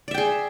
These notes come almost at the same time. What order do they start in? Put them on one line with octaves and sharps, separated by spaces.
D5 E5 G5 G#4